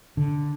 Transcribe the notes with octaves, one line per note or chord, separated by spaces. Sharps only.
D3